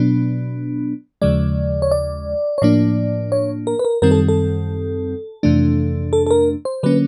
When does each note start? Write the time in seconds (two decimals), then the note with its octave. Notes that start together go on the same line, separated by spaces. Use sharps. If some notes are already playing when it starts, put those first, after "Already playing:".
Already playing: B2 F#3 B3 D4
1.22 D#2 C#3 F3 G#3 D5
1.82 C#5
1.91 D5
2.58 C#5
2.62 A2 F3 A#3 D4 D5
3.32 C#5
3.67 A#4
3.79 B4
3.85 A#4
4.02 F#2 D#3 G3 C4 A#4
4.11 A4
4.28 A4
5.43 F2 C3 E3 A3 D4
6.13 A4
6.27 A4
6.31 A#4
6.65 C5
6.83 D3 F#3 A#3 C#4 B4